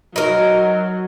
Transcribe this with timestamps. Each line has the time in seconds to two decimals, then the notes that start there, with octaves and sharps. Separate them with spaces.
0.16 F#3 D#4 A#4